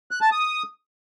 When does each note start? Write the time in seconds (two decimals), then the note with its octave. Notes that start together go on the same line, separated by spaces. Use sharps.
0.11 F#6
0.21 A5
0.32 D#6